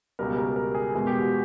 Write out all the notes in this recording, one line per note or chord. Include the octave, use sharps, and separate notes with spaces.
C#2 B2 G3 A#4
A#4
A#4
G#4
E2 B2 G#3 G#4
G4
F#4